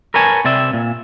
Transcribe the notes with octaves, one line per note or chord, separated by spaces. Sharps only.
A#4 B4 C#5 G#5 A5
C3 C4 D5 E5
A#2